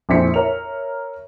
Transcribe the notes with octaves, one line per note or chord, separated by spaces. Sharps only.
A#1 F2 E4 C5 B6 C#7
A#4 C#5 E5 F7